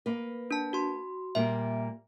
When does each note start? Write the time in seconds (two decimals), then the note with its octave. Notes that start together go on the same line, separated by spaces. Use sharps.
0.06 A#3 B4
0.51 D4 A5
0.73 F#4 C6
1.35 A#2 G3 A#3 E5